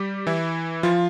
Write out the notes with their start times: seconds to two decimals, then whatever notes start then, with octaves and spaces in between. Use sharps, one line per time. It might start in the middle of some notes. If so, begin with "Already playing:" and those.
Already playing: G3 G4
0.27 E3 E4
0.83 F3 F4